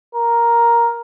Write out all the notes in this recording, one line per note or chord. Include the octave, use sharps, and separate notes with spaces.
A#4